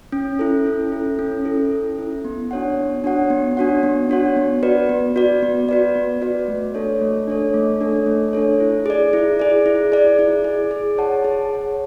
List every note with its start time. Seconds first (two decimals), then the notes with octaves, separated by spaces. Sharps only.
0.12 C#4
0.39 E4 A4
0.66 C#4
0.92 E4 A4
1.19 C#4
1.45 E4 A4
1.71 C#4
1.98 E4 A4
2.25 B3
2.51 D4 F#4 C#5 F#5
2.77 B3
3.04 D4 F#4 C#5 F#5
3.30 B3
3.57 D4 F#4 C#5 F#5
3.83 B3
4.09 D4 F#4 C#5 F#5
4.36 B3
4.63 F#4 B4 D5
4.89 B3
5.16 F#4 B4 D5
5.42 B3
5.69 F#4 B4 D5
5.95 B3
6.22 F#4 B4 D5
6.48 A3
6.75 D4 A4 C#5
7.01 A3
7.27 D4 A4 C#5
7.54 A3
7.80 D4 A4 C#5
8.06 A3
8.33 D4 A4 C#5
8.60 E4
8.86 G#4 D5
9.13 E4
9.39 G#4 D5
9.66 E4
9.92 G#4 D5
10.19 E4
10.44 G#4 D5
10.71 G#4
10.98 C#5 F#5 A5
11.25 G#4
11.51 C#5 F#5 A5